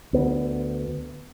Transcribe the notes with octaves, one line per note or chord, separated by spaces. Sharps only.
D2 B3 C4 D4